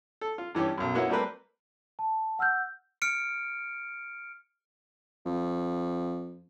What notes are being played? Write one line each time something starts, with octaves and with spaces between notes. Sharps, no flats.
A4
F4
G2 E3 C#4 G4
B1 F#2
A#3 B3 C#4 E4 F#4
G3 A3 A#3 C4 A#4 B4
A5
F#5 E6 F6 G6
F6 C#7 D7
F2